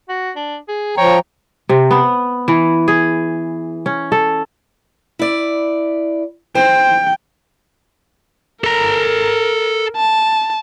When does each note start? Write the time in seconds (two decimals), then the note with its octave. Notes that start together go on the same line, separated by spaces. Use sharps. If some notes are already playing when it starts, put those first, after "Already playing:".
0.09 F#4
0.36 D4
0.68 G#4
0.98 F3 C#5 G5 A#5
1.69 C3
1.91 B3
2.48 E3
2.88 G#4
3.86 C#4
4.12 A4
5.19 E4 D5
6.55 C5 G5
8.64 A4 A#4 A#5
9.96 A5